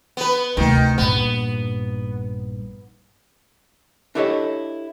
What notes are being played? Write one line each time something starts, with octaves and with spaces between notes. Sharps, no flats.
B3 B4
D2 C3 D#3
A#1 G2 B3
D4 E4 G4 A4 C#5 D#5